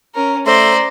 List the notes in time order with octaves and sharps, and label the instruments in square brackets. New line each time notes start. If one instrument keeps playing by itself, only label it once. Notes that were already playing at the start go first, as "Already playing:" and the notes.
[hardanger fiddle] C#4 A#4
[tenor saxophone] A3 [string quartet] C5 [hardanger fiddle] D5 [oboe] A#5